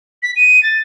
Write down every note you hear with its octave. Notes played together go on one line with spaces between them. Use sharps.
B6
D#7
A6